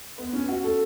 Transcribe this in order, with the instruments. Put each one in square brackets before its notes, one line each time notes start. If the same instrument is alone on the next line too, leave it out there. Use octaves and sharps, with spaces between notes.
[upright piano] B3
C#4
F#4
A4